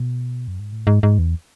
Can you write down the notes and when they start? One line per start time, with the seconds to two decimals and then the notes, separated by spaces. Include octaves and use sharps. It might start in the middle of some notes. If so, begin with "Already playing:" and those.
Already playing: B2
0.48 F#2
0.60 G#2
0.72 A2
0.87 G#2
1.03 G#2
1.19 E2